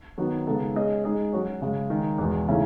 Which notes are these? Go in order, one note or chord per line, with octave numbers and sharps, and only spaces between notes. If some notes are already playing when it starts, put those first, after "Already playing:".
D#3 F#3 B3 F#4
C#3 G#3 B3 D#4 A4
G#3 C#4 G#4 D#5
G#3 D#4 G#4 D#5
F#3 C#4 F#4 C#5
F#2 C#3 G#3
D#3 G#3 D#4
E2 B2 G#3
C#3 E3 A3 D#4